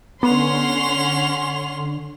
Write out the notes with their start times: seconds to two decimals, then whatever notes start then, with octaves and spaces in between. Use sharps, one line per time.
0.23 D3 B3 C#4 F#5 C6 F7